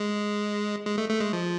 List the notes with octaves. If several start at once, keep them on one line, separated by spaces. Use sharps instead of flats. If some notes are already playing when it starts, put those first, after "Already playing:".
Already playing: G#3
G#3
A3
A3
G#3
F3